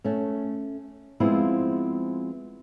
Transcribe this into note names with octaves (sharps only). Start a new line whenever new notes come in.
A3 C#4
F3 G#3 B3 C4 E4 F4